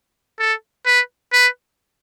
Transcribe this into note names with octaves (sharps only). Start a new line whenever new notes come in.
A4
B4
B4